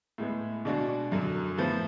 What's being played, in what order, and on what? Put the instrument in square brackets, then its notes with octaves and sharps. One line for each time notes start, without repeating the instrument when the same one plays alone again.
[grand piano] A2 G#3 B3
B2 G#3 D4 F#4
F#2 D3 F#3
A2 F3 B3